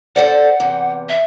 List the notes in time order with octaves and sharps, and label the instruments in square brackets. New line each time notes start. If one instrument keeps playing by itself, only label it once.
[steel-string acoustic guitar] A4 C5 D5 [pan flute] F#5
[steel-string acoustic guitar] E2 C3
[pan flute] E5